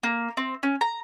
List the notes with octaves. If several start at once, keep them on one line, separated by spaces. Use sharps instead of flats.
A#3
C4
C#4
A#5